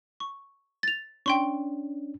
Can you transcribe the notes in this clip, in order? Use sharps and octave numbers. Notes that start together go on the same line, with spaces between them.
C#6
A6 F7
C#4 D4 G5 C6 C#6